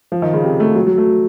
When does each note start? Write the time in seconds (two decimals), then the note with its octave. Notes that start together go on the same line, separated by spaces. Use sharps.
0.12 F3
0.22 D#3
0.33 C#3
0.43 C3
0.60 A3
0.75 F#3
0.87 F#3
0.98 A3